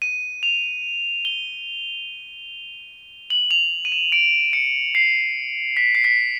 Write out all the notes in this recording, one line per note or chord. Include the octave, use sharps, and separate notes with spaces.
D#7
F7
G7
F#7
F7
D#7
E7
D7
C#7
C7
B6
C7
B6